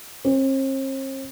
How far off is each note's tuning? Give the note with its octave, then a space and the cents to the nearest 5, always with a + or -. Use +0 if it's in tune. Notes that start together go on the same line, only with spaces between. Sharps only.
C4 +45